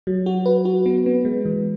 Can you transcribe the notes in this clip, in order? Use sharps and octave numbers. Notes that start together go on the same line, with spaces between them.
F#3
F#4
B4
F#4
B3
B3
G#3
E3